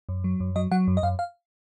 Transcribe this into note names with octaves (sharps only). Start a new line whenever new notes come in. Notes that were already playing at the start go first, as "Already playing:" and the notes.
F#2
F#3
F#2
F#3 D#5
F#3 F#5
F#2
D#5
F#2 F5
F5